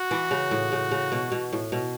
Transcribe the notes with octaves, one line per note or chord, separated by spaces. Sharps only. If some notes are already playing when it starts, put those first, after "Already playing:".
Already playing: F#4
E3
C#3
A2
C#3
C#3
B2
B2
A2
B2